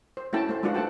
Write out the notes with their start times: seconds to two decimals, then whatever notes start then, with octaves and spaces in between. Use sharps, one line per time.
0.17 C5
0.33 A3 C#4 E4 F#4 G5 A5
0.49 A3 C5
0.63 G#3 D4 F4 F#4 B4 F#5
0.74 A3 C5 F#5 G5 A5